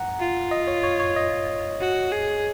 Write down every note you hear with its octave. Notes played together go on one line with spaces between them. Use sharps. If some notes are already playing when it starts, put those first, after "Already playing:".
Already playing: F#5 A#5
F4
D#5
C#5
C#5
C#5
D#5
F#4
G#4